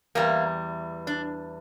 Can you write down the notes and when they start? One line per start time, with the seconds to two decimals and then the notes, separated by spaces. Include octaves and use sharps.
0.15 E2 E3 G3 A#3
1.07 D4